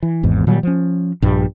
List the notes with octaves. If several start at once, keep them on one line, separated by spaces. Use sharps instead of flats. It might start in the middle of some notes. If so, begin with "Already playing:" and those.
E3
G#1 E2 G#2
A#2 D#3 F#3 G3
F3 C#4
A#1 G2 G3